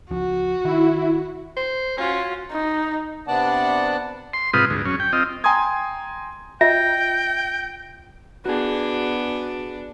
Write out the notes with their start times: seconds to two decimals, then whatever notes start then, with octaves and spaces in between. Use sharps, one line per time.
0.11 C#2 F3 F#4
0.65 D#3 E4
1.57 C5
1.98 C#4 F4 F#4
2.51 D#4
3.28 C3 B3 D4 D5 F#5 A5
4.33 C6
4.54 G#2 C3 F4 B4 D#6
4.70 D2 G#2
4.85 F#2 C#4
5.00 G5
5.13 C4 F4 D#5
5.44 G5 G#5 A#5 C6 D#6 G#6
6.61 F4 D#5 E5 G5 A#6
8.45 B3 D4 F#4 G#4